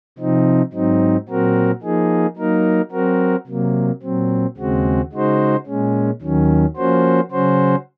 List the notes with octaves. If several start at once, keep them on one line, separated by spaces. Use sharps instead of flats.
C3 F3 C4 D#4
G#2 F#3 C4 D#4
A#2 F#3 C4 F#4 A#4
F3 A#3 D#4 G#4
F#3 A#3 D#4 A#4
F#3 C4 F#4 A#4
C3 F#3 A#3
A#2 F#3 C4
D#2 C#3 G#3 C4 F#4
C#3 G#3 D#4 F#4 C5
A#2 G#3 C#4
D#2 D#3 F#3 C#4
F3 A#3 C#4 F#4 C5
C#3 F#3 C#4 F#4 C5